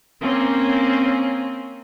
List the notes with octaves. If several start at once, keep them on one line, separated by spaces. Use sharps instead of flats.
A#3 C4 C#4